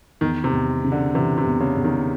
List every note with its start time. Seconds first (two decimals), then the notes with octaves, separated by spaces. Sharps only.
0.21 E2 D#3
0.44 C3
0.52 E2
0.83 C#3
0.92 D3
1.14 C3 E3
1.38 C3
1.45 E2
1.60 C#3
1.77 E2
1.84 D#3